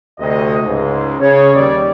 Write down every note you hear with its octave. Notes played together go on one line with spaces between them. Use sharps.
D2 C3 D#5
C#2 G#2
C#3 C#5
D#2 G3 D5